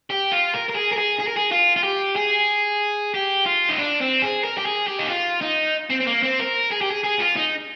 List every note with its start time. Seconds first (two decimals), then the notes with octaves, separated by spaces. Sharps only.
0.10 G4
0.32 F4
0.54 A#4
0.68 A#4
0.75 G#4
0.92 A#4
0.97 G#4
1.19 G#4
1.27 A#4
1.36 G#4
1.51 F4
1.76 F4
1.83 G4
2.16 G#4
3.14 G4
3.46 F4
3.69 D#4
3.78 D4
4.01 C4
4.22 G#4
4.44 A#4
4.58 G4
4.65 G#4
4.87 G4
4.99 D#4
5.09 F4
5.41 D#4
5.90 C4
6.00 C4
6.07 A#3
6.23 C4
6.39 A#4
6.71 G#4
6.81 G4
6.91 G#4
7.04 G#4
7.20 F4
7.37 D#4